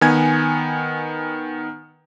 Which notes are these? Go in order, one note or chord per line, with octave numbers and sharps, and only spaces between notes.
D#3 B3 G#5 G#6